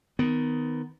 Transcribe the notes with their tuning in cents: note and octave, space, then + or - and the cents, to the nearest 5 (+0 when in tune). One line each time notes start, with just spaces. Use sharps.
D#3 +5 B3 +20